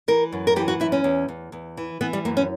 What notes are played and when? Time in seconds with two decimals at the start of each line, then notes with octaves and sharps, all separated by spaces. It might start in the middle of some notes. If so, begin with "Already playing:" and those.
0.08 E3 A#4
0.32 F#2
0.47 A#4
0.56 E3 G4
0.68 F#4
0.80 F#2 E4
0.92 C#4
1.04 E2
1.28 E2
1.52 E2
1.77 E3
2.01 E3 B3
2.13 G3
2.25 F#2 A#3
2.37 C#4